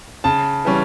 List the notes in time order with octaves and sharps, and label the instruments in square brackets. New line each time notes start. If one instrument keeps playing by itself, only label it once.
[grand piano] C#3 [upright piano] A5
[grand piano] E3 G3 C#4